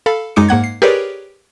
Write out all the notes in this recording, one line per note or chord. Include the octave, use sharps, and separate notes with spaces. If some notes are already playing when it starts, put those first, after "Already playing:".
A4 F5 B5
F#2 G#3 D#4 D6 C#7
G#2 A#3 F#5 G#6
C7
G4 G#4 A#4 B4 C#5 D5